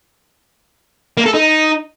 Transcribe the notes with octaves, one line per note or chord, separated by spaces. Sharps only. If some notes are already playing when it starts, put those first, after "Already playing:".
A#3
A4
D#4